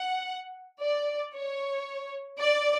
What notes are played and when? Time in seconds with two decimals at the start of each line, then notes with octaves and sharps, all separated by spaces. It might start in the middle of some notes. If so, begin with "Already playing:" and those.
Already playing: F#5
0.82 D5
1.35 C#5
2.40 D5